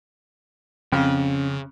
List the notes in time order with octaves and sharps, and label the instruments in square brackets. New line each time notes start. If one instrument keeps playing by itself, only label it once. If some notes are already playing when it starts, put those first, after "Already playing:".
[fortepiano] F2 [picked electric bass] C#3 [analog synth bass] C#4